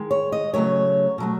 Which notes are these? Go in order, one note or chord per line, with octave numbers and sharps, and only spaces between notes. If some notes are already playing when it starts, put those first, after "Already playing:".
Already playing: D#3 G#3
C#5
D#5
C#3 F#3 A3 C#5
B2 F#3 A3